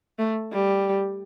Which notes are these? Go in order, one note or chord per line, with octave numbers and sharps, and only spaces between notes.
A3
G3